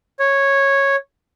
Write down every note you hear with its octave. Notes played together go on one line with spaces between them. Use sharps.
C#5